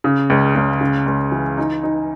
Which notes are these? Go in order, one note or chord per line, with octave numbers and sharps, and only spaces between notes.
C#3
C#2
C#2
C#3
C#2
E3
D#4
D#4